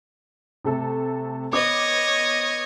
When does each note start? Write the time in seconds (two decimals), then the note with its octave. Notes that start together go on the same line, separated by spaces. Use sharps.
0.65 C3 A3 A4
1.53 B3 C#5 D#5 D6